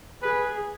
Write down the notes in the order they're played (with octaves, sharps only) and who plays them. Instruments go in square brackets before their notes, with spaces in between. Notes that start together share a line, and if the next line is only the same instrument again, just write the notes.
[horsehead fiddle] G#4 [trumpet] B4